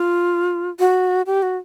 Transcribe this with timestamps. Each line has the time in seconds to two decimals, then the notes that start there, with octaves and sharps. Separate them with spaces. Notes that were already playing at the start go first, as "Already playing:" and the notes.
Already playing: F4
0.79 F#4
1.26 G4
1.43 F#4